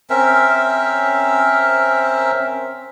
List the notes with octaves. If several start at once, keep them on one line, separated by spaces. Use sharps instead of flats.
C4 C#4 A#4 E5